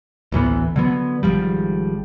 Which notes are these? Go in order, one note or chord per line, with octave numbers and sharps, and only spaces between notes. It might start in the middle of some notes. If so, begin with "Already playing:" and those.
A1 D2 E3 B3
D3 F#3 B3
G#1 D2 F3 G3